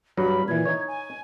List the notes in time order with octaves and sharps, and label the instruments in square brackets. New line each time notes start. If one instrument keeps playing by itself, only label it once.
[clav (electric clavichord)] G2 F#3 [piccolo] B5
[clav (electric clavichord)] A#2 E3 [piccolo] G#6
[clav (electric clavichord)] D#4 C#5
[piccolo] G#5